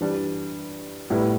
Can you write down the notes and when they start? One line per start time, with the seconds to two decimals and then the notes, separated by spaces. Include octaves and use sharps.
0.01 E3 G3 D4
1.10 A2 G3 B3 E4